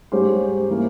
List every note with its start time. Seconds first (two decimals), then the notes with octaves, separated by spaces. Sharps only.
0.12 G#2 G3 C#4 G4 C5
0.69 E3 A#3 C#4